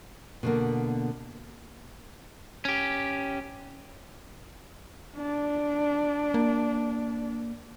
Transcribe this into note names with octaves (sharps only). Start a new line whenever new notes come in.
B2 D3 A#3
C#4 G4
D4
A#3